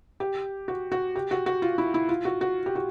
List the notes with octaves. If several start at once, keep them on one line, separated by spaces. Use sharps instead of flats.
G4
F#4
F#4
G4
F#4
F#4
F4
E4
E4
F4
F#4
F#4
G4
F#4